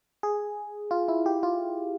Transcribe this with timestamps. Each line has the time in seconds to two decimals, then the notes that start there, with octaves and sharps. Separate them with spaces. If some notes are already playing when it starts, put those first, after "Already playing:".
0.23 G#4
0.91 F4
1.08 E4
1.26 G4
1.43 F4